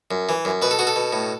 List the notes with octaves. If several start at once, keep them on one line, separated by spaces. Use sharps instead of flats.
F#2
E3
F#2
B2 B4
A4
B2 F#4
A4
B2
A2